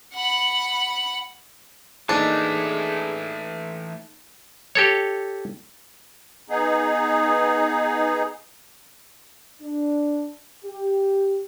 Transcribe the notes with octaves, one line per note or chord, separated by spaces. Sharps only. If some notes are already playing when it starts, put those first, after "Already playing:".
F#5 B5
E3 A3 A#3 D4 D#4 G#4 A4
G4 A4 C#5
B3 D#4 G#4
D4
G4